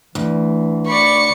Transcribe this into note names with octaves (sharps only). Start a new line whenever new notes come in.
D2 E3
D5 B5 C#6 C#7